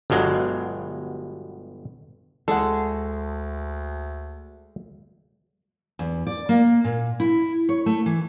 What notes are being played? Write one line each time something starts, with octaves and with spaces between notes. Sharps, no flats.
G1 G2 B2 F#3 G#3
D2 G#3 A4 F#5
E2
D5
A#3
A#2
E4
C#5
A3
E3